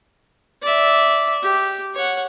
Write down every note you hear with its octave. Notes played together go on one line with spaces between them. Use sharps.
D5 E5
G4
C#5 F#5